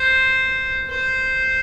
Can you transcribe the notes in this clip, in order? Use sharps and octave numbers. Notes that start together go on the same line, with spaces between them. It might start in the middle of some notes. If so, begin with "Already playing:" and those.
Already playing: C5
C5